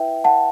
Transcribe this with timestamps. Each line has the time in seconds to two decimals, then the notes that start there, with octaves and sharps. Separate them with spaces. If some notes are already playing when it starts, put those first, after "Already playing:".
Already playing: E4 B4 E5 G5
0.24 F#5 A5